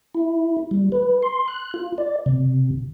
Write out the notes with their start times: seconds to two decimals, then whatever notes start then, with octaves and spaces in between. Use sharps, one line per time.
0.15 E4
0.71 G3
0.92 B4
1.23 C6
1.48 F#6
1.74 F4
1.98 D5
2.26 C3